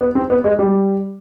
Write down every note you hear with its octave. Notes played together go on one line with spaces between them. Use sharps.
B3
C4
B3
G#3
G3